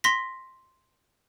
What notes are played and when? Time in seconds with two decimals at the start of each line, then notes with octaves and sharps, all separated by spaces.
0.04 C6 A#6 B6